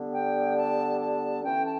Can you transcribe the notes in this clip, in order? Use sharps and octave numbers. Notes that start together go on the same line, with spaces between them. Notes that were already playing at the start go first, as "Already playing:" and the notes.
Already playing: D3 G3 B3
G5
A5
A5
E3 A3 C#4 G5
A5